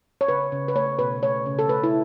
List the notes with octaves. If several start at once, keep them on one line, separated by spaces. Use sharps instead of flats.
C#5
C#3 B4
C#3
B4
A3 C#5
B2 B4
A3 C#5
C#3
A4
A3 B4
E4